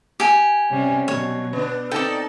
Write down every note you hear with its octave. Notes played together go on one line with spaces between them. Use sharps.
G4 G#5
C3 G3 C#4
B2 F#3 C#5
B3 D4
C4 D#4 A4 D5 G5 A5